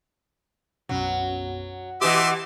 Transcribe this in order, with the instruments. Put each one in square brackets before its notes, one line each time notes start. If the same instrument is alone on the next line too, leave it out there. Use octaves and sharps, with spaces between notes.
[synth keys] B1 F#2 B2 [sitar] F#3
[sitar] B2 E3 D#5 [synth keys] G4 E7 [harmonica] E5 C6 D6